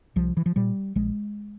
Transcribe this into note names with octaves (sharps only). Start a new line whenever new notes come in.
C2 F3
E3
F3
A#2 G3
A#1 G#3